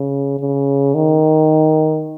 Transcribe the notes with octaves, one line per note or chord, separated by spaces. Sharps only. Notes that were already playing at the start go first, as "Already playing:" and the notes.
Already playing: C#3
C#3
D#3